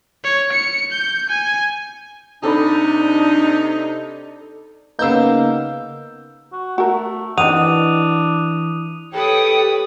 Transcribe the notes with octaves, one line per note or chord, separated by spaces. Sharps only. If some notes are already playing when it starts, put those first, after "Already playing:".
C#5
C#7
G6
G#5
C3 D4 D#4 A4 D5 B5
C#3 A#3 B3 D#4 E6 G6
F#4
A3 F#4 A#4
D#3 E3 C4 D4 F#5 D#6 D#7 F7
G4 A4 B4 C#5 G5 D#6